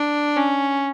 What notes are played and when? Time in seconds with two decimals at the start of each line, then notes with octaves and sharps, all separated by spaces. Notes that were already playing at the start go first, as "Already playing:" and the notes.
Already playing: D4
0.36 C#4